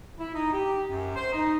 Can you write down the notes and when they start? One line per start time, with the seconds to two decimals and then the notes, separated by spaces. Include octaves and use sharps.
0.19 E4
0.33 D#4
0.52 G4
0.89 F#2
1.15 C5
1.32 D#4